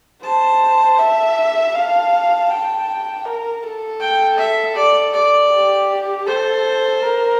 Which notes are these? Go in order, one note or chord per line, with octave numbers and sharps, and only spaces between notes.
C5 A5
E5
F5 A5
G5
A#4
A4
G5
E5
D5
D5
G4
A4 C5
A#4